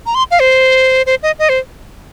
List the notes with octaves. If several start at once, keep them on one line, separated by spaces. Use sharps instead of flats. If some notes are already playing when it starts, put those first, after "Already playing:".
A#5
C6
F5
C5
C5
D#5
D#5
C5